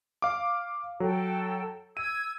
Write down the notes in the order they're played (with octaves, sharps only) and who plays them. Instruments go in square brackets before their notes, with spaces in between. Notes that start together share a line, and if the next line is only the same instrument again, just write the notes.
[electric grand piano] F5 D6
[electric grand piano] F#3 [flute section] A4 G5
[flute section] E6 G#6 [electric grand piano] D#7